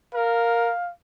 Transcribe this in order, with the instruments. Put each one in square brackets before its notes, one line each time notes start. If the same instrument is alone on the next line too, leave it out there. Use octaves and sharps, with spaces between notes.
[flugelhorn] A#4 [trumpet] F5